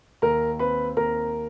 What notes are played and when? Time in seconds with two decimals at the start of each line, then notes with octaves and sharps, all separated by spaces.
0.22 D#2 A#4 A#5
0.59 C4 B4 B5
0.96 D#2 A#4 A#5